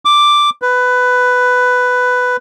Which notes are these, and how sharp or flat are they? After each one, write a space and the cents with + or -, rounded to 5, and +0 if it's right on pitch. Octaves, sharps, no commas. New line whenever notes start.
D6 +0
B4 +10